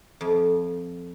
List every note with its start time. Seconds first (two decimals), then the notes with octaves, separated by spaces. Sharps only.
0.21 F2